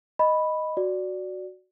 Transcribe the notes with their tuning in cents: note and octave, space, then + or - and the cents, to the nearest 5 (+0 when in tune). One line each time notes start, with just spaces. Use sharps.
D#5 +0 B5 +0
F#4 +0 D5 +0